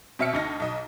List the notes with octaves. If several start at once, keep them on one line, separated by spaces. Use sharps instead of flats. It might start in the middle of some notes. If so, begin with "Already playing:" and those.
B2 C4 E5 F6 C#7
D2 D#4 A#6
B1 D#5